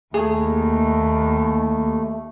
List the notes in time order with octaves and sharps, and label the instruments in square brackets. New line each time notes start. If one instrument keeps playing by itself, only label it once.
[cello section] D#2 [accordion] A3 [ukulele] G#4